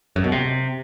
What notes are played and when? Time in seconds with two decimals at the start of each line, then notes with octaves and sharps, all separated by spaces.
0.16 F#2
0.24 B2
0.32 C3